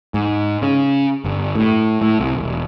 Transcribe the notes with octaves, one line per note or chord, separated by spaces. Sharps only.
G#2
C#3
G1
A2
A2
C2
E1